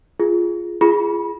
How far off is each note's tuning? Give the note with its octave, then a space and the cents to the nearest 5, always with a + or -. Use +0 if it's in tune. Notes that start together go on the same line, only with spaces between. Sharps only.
F4 -5 G#4 +0
F4 -30 G#4 +0 B5 -25